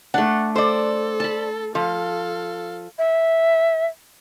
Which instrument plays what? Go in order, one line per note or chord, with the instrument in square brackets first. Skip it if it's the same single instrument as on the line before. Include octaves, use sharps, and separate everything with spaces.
[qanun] A3 D4 [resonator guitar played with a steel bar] F#5
[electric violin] A4 [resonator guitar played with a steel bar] C5 D5
[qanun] A5 B5
[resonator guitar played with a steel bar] F3 [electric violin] A4 F5
[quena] E5